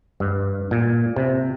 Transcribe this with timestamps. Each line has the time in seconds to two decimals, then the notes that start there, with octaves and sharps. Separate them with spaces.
0.20 G2
0.71 A#2
1.16 C3